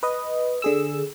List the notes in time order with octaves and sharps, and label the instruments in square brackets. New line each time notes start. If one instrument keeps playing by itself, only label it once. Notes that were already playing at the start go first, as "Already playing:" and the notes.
[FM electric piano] B4 D#5
D3 G#4 E6